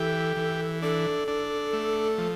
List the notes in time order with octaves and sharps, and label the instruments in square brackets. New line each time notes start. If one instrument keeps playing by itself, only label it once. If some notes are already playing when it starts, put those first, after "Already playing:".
Already playing: [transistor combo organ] E3 G4 [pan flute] A4
[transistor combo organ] E3
[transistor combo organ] D4 [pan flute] A4
[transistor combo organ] D4
A3
F3